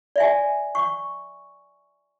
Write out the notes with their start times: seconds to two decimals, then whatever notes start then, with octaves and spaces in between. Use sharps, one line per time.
0.16 D5 E5 G#5
0.75 C#6